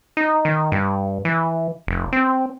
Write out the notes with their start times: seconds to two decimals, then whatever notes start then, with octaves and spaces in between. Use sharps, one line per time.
0.17 D#4
0.45 D#3
0.72 G2
1.25 E3
1.87 F1
2.13 C4